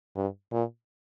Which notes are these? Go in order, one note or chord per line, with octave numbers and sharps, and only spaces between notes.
G2
A#2